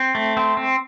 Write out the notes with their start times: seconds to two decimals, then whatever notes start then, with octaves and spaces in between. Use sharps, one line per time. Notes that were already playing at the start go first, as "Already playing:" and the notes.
Already playing: C4
0.15 A3
0.37 C4
0.57 C4